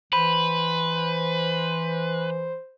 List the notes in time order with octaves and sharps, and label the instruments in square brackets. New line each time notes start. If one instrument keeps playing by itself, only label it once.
[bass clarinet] E3 [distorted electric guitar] B4 [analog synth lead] C5 [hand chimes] B5